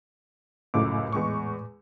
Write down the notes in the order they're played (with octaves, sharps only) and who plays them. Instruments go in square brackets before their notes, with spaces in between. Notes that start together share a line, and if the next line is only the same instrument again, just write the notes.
[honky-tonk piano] C#2 F#2 [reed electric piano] A2 D6
[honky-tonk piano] E2 G#3 C#6